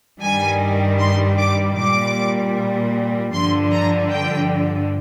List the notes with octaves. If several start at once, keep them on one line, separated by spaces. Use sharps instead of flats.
G2 D#3 G3 G#5
C6
D6
A#2 G3 D6
G2 D3 F3 C6
A#5
G5